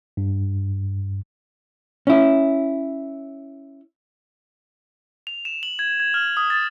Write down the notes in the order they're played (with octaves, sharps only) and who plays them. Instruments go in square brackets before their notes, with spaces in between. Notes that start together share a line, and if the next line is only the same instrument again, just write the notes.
[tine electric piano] G2
[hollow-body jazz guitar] C#4 E4
[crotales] F7
E7
F#7
G#6
G#6
F6
D#6
A6